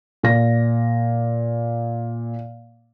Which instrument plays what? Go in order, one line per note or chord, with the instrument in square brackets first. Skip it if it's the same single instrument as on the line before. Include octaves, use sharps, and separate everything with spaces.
[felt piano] A#2 A#6